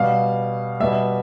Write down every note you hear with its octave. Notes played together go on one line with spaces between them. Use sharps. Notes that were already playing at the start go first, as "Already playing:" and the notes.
Already playing: B2 G3 F5
B2 G3 E5